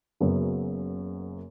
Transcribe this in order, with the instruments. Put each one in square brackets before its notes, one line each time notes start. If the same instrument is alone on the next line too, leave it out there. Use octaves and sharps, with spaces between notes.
[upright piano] F#1 F#2 C#3 F#3 B3